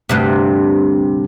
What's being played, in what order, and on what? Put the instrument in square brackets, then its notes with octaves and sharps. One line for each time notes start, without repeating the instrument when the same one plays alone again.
[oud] D2 G2 C3